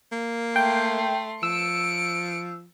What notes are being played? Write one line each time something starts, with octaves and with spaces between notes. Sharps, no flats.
A#3
A3 G5 C6
F3 E6 C#7 D7